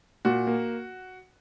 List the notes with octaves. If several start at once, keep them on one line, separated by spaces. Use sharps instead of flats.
A#2 F#4
A#3